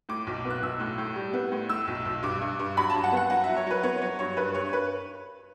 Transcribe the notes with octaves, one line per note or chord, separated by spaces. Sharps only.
A2 D6
B1
B3
F#6
B1 E6
A2
A2
G3
B3
A2
A2 E6
B1
B1
G2 D6
G2
G2
F#3 B5
A5
G2
F#5
B3
F#5
F#3 F#5
F#3 E5
C#5
F#3 B4
B3 C#5
F#3 C#5
G2 C#5
G2 B4
G2 C#5
B4